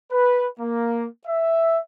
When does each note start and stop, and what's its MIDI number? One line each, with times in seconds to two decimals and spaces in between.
0.11 0.46 71
0.59 1.06 58
1.26 1.78 76